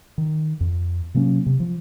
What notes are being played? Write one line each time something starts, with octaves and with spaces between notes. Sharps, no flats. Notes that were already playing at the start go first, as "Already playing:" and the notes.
D#3
F2
C3 F#3 A#3 C#4
C3
F3